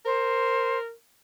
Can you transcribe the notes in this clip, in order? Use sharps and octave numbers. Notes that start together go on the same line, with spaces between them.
A#4 C5